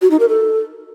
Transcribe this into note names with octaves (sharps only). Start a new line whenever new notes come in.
F#4
D#4
A#4
A4